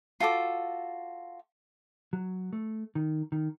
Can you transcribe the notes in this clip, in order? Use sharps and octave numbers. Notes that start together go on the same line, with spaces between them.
F4 F#4 A4 D6
F#3
A3
D#3
D#3